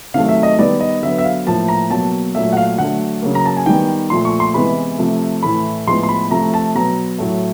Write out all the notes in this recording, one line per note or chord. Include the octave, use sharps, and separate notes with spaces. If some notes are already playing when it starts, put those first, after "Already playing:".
C3 D#3 F#3 A3 F5
E5
D#5
D#3 G3 B3 D5
D#5
D3 F#3 B3 E5
E5
F5
A2 F3 A#3 A5
A#5
B2 F#3 A#3 A5
A#2 F#3 A3 E5
F#5
F5
D3 F#3 A3 F#5
C#3 F#3 A#3
A#5
A5
G#5
D#3 G3 B3 G5
A#2 F3 A3 C6
C#6
C6
C3 E3 G#3 B3 B5
C3 F3 A3
A2 E3 A3 B5
A2 F3 G#3 B3 C6
C6
B5
C3 F3 A3 A#5
A5
B2 F#3 B3 A#5
A2 F#3 A3